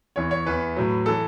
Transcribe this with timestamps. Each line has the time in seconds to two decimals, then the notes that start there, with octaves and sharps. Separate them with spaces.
0.16 E2 E3 C#5
0.31 C#5
0.46 E2 E3 B4
0.77 A2 F#3
1.06 E3 A4